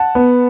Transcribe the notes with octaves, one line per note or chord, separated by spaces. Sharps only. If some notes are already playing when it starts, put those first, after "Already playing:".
Already playing: F#5 A5
B3